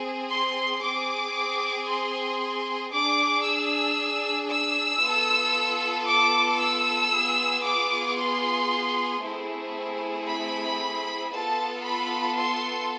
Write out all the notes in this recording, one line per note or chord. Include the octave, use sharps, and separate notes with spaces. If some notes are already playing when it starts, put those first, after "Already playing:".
Already playing: C4 G#4
C6
C4 G#4 D6
C6
D4 G#4 D6
E6
E6
B3 F4 A4
D6
E6
B3 F4 G#4
D6
C6
A3 C4 E4 G#4
B5
B3 F4 A4 A5
B5
C6